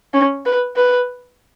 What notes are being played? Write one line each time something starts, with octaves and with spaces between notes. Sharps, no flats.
C#4
B4
B4